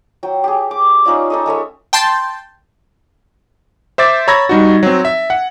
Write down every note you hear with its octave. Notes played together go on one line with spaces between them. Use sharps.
F#3 G5
G4 G#4
D6
C#4 D#4 F4 D5
D#4 A4 D#5
G#3 A4 C#5 E5
G5 A5 C6 G6 A6
C5 E5 D6 A6
C#5 A#5 B5 E6 G#6 A#6
G3 D#4 F#4
F#3 C4
E5
F#5